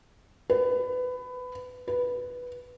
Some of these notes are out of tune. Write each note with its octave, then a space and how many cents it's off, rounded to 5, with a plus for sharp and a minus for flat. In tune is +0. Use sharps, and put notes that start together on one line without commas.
B4 +20
B4 -5